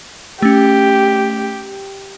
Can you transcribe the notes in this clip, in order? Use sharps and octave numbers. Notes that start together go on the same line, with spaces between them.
A3 C#4 G4